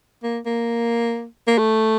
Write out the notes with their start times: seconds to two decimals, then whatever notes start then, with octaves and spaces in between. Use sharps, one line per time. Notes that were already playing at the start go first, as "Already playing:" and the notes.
0.23 A#3
0.46 A#3
1.48 A#3
1.58 A3